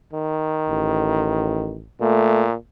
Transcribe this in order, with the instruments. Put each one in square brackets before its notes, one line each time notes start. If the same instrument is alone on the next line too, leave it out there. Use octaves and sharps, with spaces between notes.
[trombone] D#3
[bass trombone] A1
[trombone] A#2 [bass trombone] A3